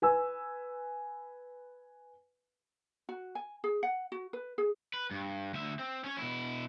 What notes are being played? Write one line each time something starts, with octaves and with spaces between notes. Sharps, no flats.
B4 G#5 E6
F#4
G#5
G#4
F#5
F#4
B4
G#4
B4
G2
D2 E5
C4
C#4 C#5
B2 E4